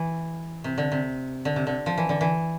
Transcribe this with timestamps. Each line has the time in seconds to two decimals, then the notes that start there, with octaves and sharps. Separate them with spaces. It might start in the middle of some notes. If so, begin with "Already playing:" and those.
Already playing: E3
0.64 C3
0.78 D3
0.92 C3
1.45 D3
1.56 C3
1.67 D3
1.86 F3
1.98 E3
2.09 D3
2.21 E3